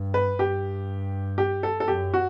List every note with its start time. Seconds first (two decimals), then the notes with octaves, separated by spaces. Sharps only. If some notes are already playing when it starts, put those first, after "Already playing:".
Already playing: G2
0.14 B4
0.39 G2 G4
1.38 G4
1.63 A4
1.80 A4
1.88 F#2 G4
2.14 F#4